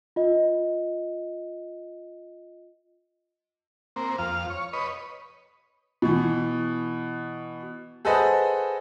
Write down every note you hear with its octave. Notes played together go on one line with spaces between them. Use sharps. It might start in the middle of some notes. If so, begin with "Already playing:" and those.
F4 D#5
A#3 C4
F2 F5
C#5
B4 C#5 D#5
B2 E3
G#4 A4 B4 C5 D#5 F#5